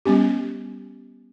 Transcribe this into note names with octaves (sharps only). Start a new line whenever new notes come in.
G3 B3 C#4 G4